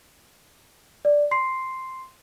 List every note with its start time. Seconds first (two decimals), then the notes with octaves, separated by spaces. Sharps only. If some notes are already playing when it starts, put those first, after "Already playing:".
1.05 D5
1.31 C6 C7